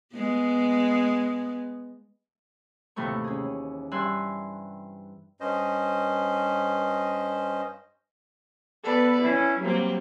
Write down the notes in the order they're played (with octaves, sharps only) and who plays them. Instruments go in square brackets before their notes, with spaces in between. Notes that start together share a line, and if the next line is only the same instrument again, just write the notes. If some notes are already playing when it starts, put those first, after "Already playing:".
[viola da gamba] G#3 B3
[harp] D#2 A2 C3 E3 A3 C#6
C#4 G#4
G2 B4 E5 G#5 C6 F#6
[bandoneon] G2 C#4 C5 D#5
[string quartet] B3 A4 B4 D5
C#4 E4
F#3 G3 A#3 C4